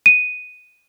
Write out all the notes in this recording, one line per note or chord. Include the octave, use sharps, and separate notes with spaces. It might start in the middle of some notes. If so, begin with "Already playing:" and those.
D#7